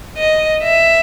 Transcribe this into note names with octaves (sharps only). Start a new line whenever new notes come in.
D#5
E5